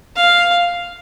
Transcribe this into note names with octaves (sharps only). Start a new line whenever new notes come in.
F5